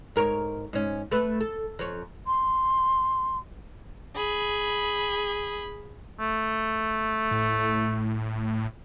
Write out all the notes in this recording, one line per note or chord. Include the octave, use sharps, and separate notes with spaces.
G#2 A#4 C#5
G#2 C#4
A3 B4
A4
F2 C#5
C6
G#4 B5
A3
A2